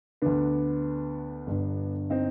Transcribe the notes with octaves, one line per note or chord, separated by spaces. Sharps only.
D2 D3 B3 D4
G1 G2 D3
C4 D#4